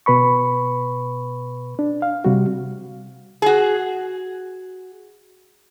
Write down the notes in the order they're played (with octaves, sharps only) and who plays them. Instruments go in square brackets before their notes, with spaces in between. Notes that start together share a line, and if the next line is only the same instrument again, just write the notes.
[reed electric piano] B2 B4 B5 C#6
D4
F5
C3 G3 F#4
[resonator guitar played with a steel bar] F#4 G#4